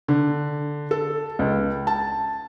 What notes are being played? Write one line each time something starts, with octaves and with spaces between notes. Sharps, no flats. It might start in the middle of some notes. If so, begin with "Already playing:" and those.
D3
A4
C#2
A5